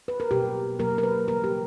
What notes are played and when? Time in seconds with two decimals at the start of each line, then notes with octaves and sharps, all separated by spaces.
0.08 B4
0.20 A#4
0.31 B2 F#3 A#3 G4
0.79 B2 F#3 A#3 A#4
0.98 A#4
1.03 B4
1.28 C#3 E3 G3 A#3 A#4
1.44 G4